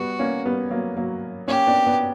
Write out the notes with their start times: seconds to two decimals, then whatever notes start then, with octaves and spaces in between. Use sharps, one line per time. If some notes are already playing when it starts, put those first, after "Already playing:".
Already playing: G3 B3 F#4
0.19 A#3 C#4
0.45 G3 B3
0.70 F#3 A#3
0.96 F#3 A#3
1.48 A#3 C#4 G4
1.67 B3 D4
1.86 B3 D4